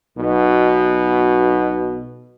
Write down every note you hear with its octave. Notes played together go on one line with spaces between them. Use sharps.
B1 B2